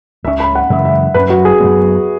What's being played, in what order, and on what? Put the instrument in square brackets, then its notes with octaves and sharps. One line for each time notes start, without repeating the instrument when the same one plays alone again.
[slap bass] C#2 C#3 E3 C#4 [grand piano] E5
[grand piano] B5
F#5
[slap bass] F#2 C#3 E3 G#3 [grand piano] E5
[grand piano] E5
[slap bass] F#2 F#3 C#4 [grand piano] B4
[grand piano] F#4
G#4
[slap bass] F#2 F#3 B3